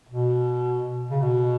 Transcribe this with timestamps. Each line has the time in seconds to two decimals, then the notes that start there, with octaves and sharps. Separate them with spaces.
0.09 B2
1.11 C#3
1.22 B2